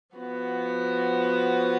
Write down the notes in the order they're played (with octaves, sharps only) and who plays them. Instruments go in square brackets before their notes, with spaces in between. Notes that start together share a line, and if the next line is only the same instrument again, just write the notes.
[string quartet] F3 B3 F#4